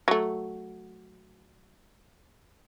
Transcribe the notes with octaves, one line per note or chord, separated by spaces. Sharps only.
F#3 A3